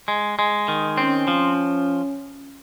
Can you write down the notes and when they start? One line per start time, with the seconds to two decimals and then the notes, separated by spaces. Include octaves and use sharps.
0.08 G#3
0.39 G#3
0.68 D#3
0.98 C4 C#4
1.28 F3